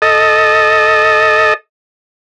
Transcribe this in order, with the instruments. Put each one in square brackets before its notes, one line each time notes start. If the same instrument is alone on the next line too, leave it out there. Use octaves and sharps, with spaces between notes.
[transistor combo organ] A4 D#5